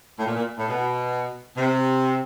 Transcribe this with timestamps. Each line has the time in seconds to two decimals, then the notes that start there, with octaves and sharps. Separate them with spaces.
0.19 A2
0.25 A#2
0.36 A#2
0.57 A2
0.68 B2
1.56 C3